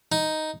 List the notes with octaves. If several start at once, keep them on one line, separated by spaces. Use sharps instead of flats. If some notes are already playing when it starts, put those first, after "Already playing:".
D#4